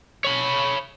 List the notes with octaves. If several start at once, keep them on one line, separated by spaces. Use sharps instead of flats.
C#5 B5